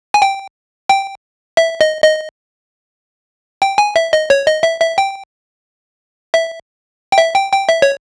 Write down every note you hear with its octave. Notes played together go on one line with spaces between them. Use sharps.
G#5
G5
G5
E5
D#5
D#5
G5
G#5
E5
D#5
C#5
D#5
E5
E5
G5
E5
G5
E5
G5
G5
E5
C#5